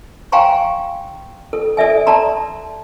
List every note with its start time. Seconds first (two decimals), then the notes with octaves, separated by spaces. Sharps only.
0.32 F5 G5 G#5 A#5 C6 C#6
1.53 A4
1.77 A4 D5 E5 G#5
2.06 A4 D5 A5 A#5 C6